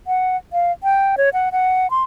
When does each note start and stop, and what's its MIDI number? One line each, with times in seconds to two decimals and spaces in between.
0.07 0.36 78
0.53 0.72 77
0.83 1.16 79
1.18 1.29 73
1.33 1.49 78
1.52 1.90 78
1.90 2.03 84